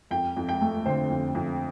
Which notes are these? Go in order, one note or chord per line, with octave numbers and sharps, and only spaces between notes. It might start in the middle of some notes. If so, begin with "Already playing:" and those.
F2 G5
F2
G5
A3
D3 C5
F2
F2